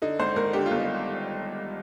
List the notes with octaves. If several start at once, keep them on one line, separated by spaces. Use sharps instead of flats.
D3 D#4
G#1 C5
G#1 A#4
D3 G4
F4
G1
D#4